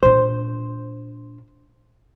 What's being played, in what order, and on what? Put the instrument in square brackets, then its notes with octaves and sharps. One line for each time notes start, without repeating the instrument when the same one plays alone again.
[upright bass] A#2 D4 [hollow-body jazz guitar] C5